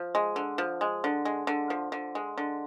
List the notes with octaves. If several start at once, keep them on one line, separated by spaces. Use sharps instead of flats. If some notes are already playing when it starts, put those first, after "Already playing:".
Already playing: F3
G#3
D3
F3
G#3
D3
G#3
D3
F3
D3
G#3
D3